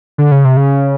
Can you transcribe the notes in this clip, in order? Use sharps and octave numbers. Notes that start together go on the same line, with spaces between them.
D3
C#3
C3
C#3